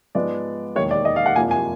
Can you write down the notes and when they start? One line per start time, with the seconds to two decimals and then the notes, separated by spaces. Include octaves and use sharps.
0.15 G#2 F3 G#3 B3 D5
0.76 E1 D#2 D#3 C#5
0.91 D5
1.05 D#5
1.16 F5
1.26 F#5
1.36 F#1 F2 C3 F3 A#3 G#5
1.51 G#5